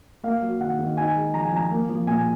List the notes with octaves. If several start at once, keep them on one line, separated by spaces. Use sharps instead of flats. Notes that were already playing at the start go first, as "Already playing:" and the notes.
A#3 F5
F#3
D#3 F#5
D#3
D#4 G#5
G#3
F3 A#5
G#5
F3 A#5
A#3
F3
A#2 G#5